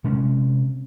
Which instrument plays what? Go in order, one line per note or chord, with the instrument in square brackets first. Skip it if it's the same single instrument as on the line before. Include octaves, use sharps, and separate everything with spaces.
[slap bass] C3 G#3 C#4